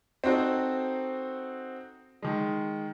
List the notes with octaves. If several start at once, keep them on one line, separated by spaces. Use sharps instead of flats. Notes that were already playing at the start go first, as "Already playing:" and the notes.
C4 D#4 F#4 A4 C5
D#3 G#3